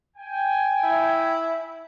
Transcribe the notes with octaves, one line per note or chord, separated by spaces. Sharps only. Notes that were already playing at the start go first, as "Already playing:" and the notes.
G5 G#5
E4